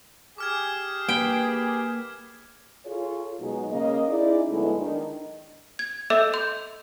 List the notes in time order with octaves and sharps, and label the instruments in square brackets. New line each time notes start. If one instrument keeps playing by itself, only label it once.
[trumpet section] G4 G#4 [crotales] D6 F6 G#6
[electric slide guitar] A#3 B4 [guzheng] G5
[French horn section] F4 G#4 A4 C#5
B2 F#3 G#3 D#4 F#4 G#4
C#3 A#3 C#5 D#5
C#4 D#4 E4 G#4 D5
D2 F#3 G#3 B3 E4 A4
D#3 D4
[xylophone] G#6
A4 D#5 E5 D6 E6 G6
C6 G6